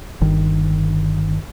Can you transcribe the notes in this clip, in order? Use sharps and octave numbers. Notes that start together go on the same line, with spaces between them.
G1 D#3